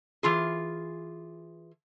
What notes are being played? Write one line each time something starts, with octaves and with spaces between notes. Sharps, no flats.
E3 F4 G#4